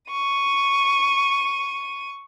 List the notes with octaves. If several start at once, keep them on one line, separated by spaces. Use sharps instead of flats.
C#6 D#7